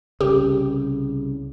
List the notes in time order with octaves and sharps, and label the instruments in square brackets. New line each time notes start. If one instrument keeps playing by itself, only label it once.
[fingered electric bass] C2 C#3 [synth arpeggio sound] G4